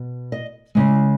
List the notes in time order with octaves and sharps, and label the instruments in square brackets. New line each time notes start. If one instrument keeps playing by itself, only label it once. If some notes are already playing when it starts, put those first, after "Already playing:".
Already playing: [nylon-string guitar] B2
D#5
C#3 G#3